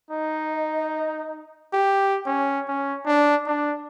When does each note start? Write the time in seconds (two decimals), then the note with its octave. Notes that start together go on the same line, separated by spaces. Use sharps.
0.10 D#4 D#5
1.73 G4
2.26 C#4
2.68 C#4
3.06 D4
3.47 D4